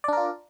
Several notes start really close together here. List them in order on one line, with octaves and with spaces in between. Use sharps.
D5 D4 A#4 F4